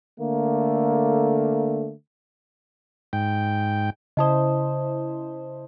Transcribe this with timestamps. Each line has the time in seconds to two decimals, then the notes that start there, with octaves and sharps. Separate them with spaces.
0.20 D3 A3 A#3
3.13 G#2 G5
4.17 C#3 E4 C5 D#5 A5 D#6